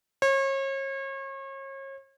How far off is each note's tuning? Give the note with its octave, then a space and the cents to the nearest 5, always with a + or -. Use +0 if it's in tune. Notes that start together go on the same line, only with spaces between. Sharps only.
C#5 -35